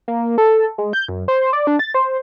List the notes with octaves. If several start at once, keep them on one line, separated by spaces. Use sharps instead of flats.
A#3
A4
G#3
G6
F#2
C5
D5
D4
A6
C5